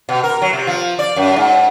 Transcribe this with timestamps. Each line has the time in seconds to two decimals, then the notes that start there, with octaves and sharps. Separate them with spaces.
0.09 B2
0.24 A#4
0.42 F#3
0.53 C3
0.67 F3
0.99 D5
1.16 F#2
1.36 G#2